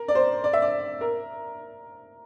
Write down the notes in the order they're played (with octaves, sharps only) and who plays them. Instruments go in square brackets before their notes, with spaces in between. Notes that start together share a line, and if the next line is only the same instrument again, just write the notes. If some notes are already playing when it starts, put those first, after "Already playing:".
Already playing: [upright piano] A#4
D5
C5
D5
E5
D5
A#4